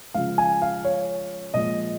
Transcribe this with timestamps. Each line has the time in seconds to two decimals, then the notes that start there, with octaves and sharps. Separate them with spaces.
0.14 C#3 F3 G#3 F5
0.38 G#5
0.62 F5
0.84 C#5
1.54 A#2 F3 G#3 D#5